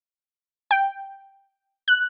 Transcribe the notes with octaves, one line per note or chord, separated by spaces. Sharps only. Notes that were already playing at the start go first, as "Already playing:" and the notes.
G5
F#6